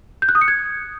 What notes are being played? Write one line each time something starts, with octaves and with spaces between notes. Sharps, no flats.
G6
F#6
D#6
C#7
G#6